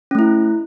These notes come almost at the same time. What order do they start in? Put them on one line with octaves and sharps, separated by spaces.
C#4 A3 E4